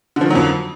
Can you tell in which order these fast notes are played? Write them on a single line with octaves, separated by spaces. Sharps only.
D3 F3 D#3 F#3 F2